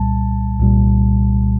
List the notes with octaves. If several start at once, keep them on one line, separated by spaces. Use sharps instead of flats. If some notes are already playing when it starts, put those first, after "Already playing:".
Already playing: C2 A#2 G3 A5
C2 A#2 G3